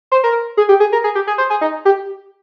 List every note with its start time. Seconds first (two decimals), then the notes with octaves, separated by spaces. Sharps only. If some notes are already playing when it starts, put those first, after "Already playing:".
0.12 C5
0.24 A#4
0.57 G#4
0.69 G4
0.80 G#4
0.92 A#4
1.04 G#4
1.15 G4
1.27 G#4
1.38 C5
1.50 G#4
1.61 D#4
1.85 G4